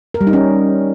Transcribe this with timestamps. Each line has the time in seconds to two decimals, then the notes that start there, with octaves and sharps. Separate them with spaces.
0.14 A#4
0.21 G3
0.27 D#4
0.33 C#4